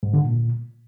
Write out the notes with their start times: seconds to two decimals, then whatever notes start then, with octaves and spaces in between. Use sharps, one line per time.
0.03 G#2
0.14 D3
0.24 A#2